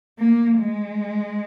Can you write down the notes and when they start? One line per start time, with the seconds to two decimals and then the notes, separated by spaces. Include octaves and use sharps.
0.19 A#3
0.59 G#3